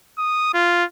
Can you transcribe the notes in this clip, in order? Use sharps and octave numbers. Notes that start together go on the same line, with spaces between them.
D#6
F4